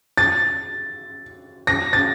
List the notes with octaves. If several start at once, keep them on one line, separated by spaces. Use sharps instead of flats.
A6
A#6
A6